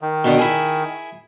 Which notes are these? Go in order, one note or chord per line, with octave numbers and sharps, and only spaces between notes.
D#3
B2 D3
E4 G#4